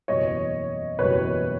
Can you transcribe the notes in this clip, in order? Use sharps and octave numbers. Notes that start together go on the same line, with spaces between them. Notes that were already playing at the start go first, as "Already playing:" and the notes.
F#1 E2 B2 G3 C#5 D#5
F#1 E2 B2 G3 B4 C#5